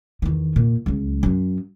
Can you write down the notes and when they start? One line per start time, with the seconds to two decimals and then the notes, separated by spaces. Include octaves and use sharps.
0.22 E2 D#3
0.56 A#2
0.86 C#2 F#3
1.23 F#2 F#3